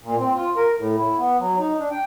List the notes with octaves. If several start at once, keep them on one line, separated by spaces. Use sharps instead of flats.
A#2
C4
F4
A#4
A2
E4
B3
F#3
D#4
D4
G5